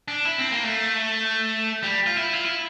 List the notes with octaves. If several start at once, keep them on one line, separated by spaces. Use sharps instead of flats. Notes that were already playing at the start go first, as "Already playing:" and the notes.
D4
E4
C4
A#3
A3
G3
F4
E4
F4
E4